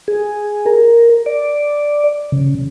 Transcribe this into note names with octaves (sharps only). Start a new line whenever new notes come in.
G#4
A#4
D5
C#3